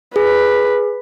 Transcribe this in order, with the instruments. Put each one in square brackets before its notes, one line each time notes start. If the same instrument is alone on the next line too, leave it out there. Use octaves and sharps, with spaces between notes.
[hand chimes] G#4 [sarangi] B4